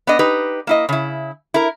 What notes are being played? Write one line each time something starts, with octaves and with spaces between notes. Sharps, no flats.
B3 D4 D#5
D#4 G4 B4
A#3 E4 D#5
C#3 E4
E4 A#4